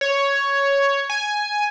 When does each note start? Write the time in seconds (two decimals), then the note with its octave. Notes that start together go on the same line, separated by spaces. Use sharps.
0.01 C#5
1.10 G#5